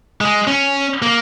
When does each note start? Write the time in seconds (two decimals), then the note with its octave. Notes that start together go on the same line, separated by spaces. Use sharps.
0.21 G#3
0.47 C#4
1.02 A#3